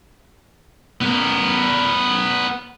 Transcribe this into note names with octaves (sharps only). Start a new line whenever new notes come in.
B3 A#4